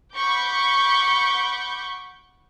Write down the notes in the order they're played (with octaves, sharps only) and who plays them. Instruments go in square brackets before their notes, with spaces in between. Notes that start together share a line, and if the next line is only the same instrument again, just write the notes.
[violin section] F#5 B5 C#6 D6 G6